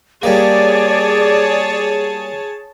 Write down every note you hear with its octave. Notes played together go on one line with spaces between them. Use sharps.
G3 A#3 G#4 C#5 D5 A5